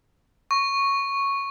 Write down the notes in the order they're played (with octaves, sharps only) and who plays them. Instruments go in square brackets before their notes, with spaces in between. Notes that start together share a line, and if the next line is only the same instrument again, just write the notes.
[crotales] C#6